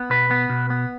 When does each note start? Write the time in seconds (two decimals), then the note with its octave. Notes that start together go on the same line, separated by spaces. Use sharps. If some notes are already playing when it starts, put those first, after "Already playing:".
Already playing: B3
0.10 B2 B4
0.31 B3
0.50 B2
0.70 B3